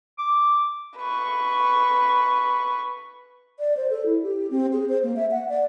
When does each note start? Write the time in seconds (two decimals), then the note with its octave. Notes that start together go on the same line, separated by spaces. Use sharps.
0.19 D6
0.97 B4 C#6
3.59 D5
3.77 C5
3.90 A4
4.06 E4
4.23 G4
4.51 C4
4.73 G#4
4.89 C5
5.03 A#3
5.16 E5
5.31 F#5
5.49 D5